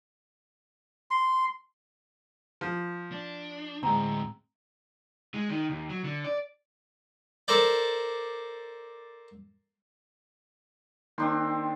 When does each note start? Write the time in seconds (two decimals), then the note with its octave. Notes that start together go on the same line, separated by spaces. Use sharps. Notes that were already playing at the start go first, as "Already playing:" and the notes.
1.11 C6
2.61 F3
3.12 D4
3.83 D2 A2 G#3 C4 A#5
5.34 G#3
5.50 D#3
5.70 D#2
5.89 F#3
6.04 D3
6.24 D5
7.48 A4 A#4 C5 D5
11.18 D#3 A#3 C4 D4 G5 C6